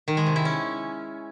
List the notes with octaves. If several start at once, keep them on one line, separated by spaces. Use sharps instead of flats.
D#3
G#3
C3
E4
C#4